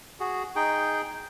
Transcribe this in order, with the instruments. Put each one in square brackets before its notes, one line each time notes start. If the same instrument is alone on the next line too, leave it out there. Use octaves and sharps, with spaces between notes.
[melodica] F#4 G#4
D#4 G#4 G5